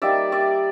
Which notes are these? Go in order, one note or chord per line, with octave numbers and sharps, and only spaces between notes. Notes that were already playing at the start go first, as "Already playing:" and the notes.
G3 A#3 D#4 D5 E5
D5 E5